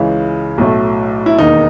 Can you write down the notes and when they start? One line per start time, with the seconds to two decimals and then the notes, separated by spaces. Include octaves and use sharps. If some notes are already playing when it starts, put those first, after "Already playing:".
Already playing: C#2 C#3 E3 G#3
0.58 B1 A2 F#3 A3
1.26 E4
1.38 E1 D#2 D#3 D#4